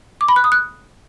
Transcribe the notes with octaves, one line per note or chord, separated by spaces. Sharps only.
D6
B5
F#6
D#6
F#6